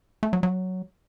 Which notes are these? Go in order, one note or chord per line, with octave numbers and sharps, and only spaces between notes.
A3
F#3
F#3